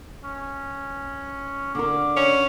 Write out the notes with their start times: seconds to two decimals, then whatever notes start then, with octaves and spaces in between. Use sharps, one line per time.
0.24 C#4
1.75 D3 A#4 D6
2.17 C#4